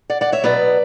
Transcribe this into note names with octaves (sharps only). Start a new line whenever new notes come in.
D5 F#5
D5 F#5
C#5 E5
B2 F#3 B3 B4 D5